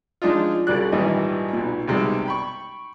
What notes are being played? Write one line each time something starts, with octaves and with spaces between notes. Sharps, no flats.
F3 G#3 D4 D#4 F4
C2 C#3 F#3 G3 D5 F#6
G#1 A#2 D#3 E3 G3 D#5
B1 A#2
B1 C3 G3 G#3
G5 B5 C#6